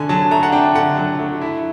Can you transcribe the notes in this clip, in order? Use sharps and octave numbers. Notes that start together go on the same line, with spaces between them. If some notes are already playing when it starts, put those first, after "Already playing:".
Already playing: D3 A3 D4 G#5
F#3 A5
A3 A#5
F#5
D4 G5
D3 F#5
F#3
A3
E4